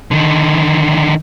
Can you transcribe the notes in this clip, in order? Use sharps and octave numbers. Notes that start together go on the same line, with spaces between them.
D3 D#3